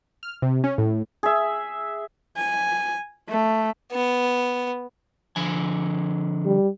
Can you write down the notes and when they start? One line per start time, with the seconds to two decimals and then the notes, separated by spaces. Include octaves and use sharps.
0.23 F6
0.42 C3
0.64 C#4
0.78 A2
1.23 G#4 E5
2.37 G#5
3.29 A3
3.92 B3
5.36 D3 F3 G#5
6.46 G3